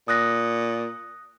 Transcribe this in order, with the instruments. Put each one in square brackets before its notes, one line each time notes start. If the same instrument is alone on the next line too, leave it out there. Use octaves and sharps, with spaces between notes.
[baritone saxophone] A#2 [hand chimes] D#6 F#6 A#6